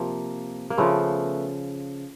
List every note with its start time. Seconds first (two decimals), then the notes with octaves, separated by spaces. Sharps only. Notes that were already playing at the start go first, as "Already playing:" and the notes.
Already playing: C3 F3 A#3
0.70 A#3
0.78 C#3 F3 A3 B3